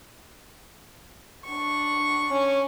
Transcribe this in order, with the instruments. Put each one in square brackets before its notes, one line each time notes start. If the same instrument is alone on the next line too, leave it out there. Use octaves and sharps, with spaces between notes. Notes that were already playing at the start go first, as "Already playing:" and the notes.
[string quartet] D4 C#6
[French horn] C#4